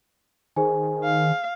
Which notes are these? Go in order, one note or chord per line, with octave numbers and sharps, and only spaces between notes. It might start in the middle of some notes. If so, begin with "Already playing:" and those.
D#3 G#4 C5 G#5
F5